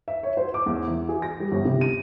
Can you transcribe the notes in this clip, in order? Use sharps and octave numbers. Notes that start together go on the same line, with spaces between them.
E5
C#5
C5
D6
E2
E3
G#4
A#6
G3
G1
C3
D#7